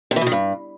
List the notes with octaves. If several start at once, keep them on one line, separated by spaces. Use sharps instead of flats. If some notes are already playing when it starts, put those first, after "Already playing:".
C3
E3
B2
D#3
G2